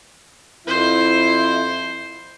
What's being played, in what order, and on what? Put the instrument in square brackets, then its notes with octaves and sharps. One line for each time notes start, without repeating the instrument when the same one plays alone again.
[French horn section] F2 E4 [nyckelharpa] C5